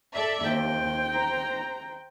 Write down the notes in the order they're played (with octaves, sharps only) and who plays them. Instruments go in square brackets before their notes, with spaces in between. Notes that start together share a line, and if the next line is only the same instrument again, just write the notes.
[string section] A4 D5 E5
[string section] D#2 [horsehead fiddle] C5 G5
[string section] A#5